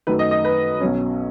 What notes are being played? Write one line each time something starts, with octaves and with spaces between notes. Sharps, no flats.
F#2 D#3 A3 B4
D#5
D#5
B4
B1 B2 F#3 C#4